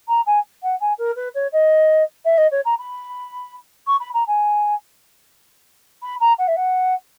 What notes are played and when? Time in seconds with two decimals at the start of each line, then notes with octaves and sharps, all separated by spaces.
0.08 A#5
0.26 G#5
0.63 F#5
0.81 G#5
0.99 A#4
1.16 B4
1.35 C#5
1.52 D#5
2.25 E5
2.38 D#5
2.51 C#5
2.65 A#5
2.79 B5
3.87 C#6
4.00 B5
4.14 A#5
4.27 G#5
6.03 B5
6.20 A#5
6.39 F#5
6.48 E5
6.56 F#5